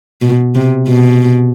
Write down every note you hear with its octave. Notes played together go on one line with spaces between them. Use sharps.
B2
C3
B2